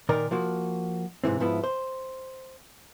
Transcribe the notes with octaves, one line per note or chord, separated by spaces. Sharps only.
A#2 D#3 D#4 A#4 D5
F3 A#3 F#4
G#2 C3 E3 C4
G#2 F3 B3 E4
C5